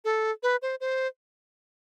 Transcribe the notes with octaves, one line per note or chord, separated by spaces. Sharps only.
A4
B4
C5
C5